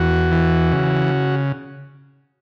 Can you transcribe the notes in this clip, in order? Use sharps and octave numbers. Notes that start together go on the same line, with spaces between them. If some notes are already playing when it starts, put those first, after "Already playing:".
Already playing: E2 F#4
E3
C#3